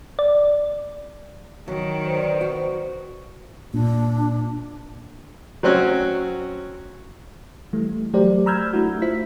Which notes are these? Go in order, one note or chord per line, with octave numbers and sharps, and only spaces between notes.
D5
D#3 F#3
B4 C5 D5
F#4
A#2 D4
F#3 C4 C#4 F#4
E3 G3 A3
F#3 A3 G4 A#4 C5 D5
A#5 B5 E6 F6 G6 G#6
A3 D4 E4 F#4
F4 C5 E5 B6